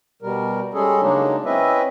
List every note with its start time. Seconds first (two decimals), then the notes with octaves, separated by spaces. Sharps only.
0.22 B2 G3 A#4
0.74 G3 G#3 C#4 G#4 A4
1.01 C#3 F#3 G#3 A#3 D4 D#4
1.45 C4 C#4 E4 B4 D#5 E5